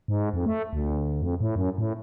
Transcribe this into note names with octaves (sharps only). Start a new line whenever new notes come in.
G#2
F2
A3
D2
F2
A2
F#2
A2